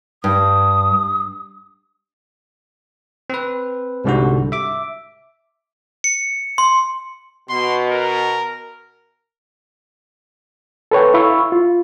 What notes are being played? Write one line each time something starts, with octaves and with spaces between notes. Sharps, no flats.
G2 D#6
C4 B4
C2 G#2 D3 G3 F#4
E5 D6
C#7
C6
B2 C6
A#4
A4 B4 C#5 G5
E4 F5 B5 C#6 E6
F4